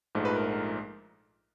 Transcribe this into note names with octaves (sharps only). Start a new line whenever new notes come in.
A#1 G#2 F3 A3
B4
A#4